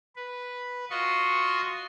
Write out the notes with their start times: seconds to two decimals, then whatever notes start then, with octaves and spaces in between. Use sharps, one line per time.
0.16 B4
0.90 F4 F#4 D#5 C6 C#6